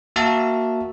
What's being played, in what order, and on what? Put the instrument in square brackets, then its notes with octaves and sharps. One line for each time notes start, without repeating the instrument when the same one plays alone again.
[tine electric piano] A#3 F#4 A#4 E5 A5